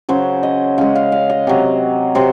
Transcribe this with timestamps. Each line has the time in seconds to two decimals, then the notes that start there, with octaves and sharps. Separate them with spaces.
0.09 C#3 F#3 C5
0.43 D#5
0.78 C#3 G#3 F5
0.95 F5
1.12 F5
1.30 D#5
1.47 C3 F#3
2.15 C3 F#3 C5